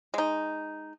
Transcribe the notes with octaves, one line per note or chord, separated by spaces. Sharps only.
G#3 D#4